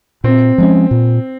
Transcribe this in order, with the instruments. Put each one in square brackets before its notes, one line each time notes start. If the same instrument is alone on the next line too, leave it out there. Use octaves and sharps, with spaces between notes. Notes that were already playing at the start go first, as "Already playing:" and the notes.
[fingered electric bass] A#2 [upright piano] C4
[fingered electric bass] F3 G#3 C#4
A#2